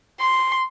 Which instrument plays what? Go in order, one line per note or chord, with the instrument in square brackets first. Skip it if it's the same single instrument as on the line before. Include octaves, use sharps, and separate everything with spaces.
[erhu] C6